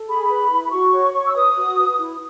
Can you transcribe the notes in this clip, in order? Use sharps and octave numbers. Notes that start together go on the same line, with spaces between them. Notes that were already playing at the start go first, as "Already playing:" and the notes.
Already playing: A4
G#4 B5
B4
E4
B5
F#4 C#6
C#5
C#5
E6
B4 D#6
F#4
B4
E4